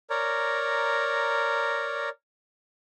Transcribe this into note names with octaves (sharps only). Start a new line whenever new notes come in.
A#4 C#5 D5 A#5